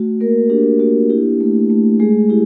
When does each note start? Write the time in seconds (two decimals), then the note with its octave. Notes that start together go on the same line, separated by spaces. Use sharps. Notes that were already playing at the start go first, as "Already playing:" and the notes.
Already playing: A3 F#4
0.21 A#3 A#4
0.50 D4 G4
0.80 A#3 F#4
1.10 E4 G4
1.41 A3
1.70 A3
2.00 G#3 G#4
2.30 E4 G4